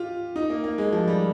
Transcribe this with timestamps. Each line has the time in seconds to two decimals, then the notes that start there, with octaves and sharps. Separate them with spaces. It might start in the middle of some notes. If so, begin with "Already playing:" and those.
Already playing: F4 G4
0.36 D#4
0.50 A#3
0.64 A#3
0.78 G#3
0.92 F3
1.08 G3